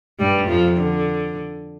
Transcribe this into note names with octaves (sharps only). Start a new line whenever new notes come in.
G2 G3
F2 F3
D3